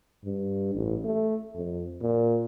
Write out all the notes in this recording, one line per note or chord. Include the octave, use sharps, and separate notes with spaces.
G2
A1
A3
F2
A#2